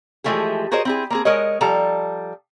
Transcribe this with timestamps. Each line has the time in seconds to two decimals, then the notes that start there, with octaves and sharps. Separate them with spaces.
0.24 E3 F3 G#3 A3 G4 G#4
0.72 F#4 G#4 A#4 C5 C#5 D#5
0.85 C4 E4 G#4
1.10 A#3 C4 G#4
1.25 G#3 A#4 C#5 D#5
1.61 F3 G3 A4 G5 A#5